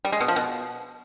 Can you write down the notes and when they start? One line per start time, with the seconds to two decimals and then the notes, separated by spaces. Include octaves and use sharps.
0.05 G3
0.12 G#3
0.20 B2
0.28 F3
0.36 B2